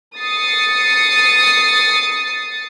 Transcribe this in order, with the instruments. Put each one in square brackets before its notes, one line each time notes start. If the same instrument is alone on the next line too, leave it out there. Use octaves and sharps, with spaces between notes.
[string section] D#6 A6 C7 C#7